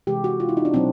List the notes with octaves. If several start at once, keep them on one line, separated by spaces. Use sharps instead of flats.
C3 E3 G#3 G4
F#4
F4
E4
D#4
D4
B2 F#3 C4